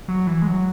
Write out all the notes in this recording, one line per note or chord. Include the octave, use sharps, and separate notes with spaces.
F#3
E3
G#3
F#3